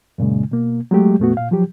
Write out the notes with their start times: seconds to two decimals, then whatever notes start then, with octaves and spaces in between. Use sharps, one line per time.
0.18 F#2 A#2 C#3 G#3
0.51 B2 A#3
0.91 F#3 G#3 A3 G4
1.20 F2 A#2 A3 B3 F#4
1.37 A#2 F5
1.51 F3 F#3 G4